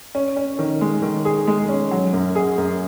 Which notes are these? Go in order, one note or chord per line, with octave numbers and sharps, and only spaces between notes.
C#4
C#4
D#3
G#3
D#3
G#4
G#3
C#4
F#3
F#2
G#4
F#2